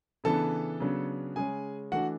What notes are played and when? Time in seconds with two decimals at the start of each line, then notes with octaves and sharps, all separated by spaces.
0.24 C#3 E3 B3 D4 A4 A5
0.80 C#3 F#3 B3 D4
1.36 C#3 G#3 C#4 G#4 G#5
1.92 E3 A3 D4 F#4 F#5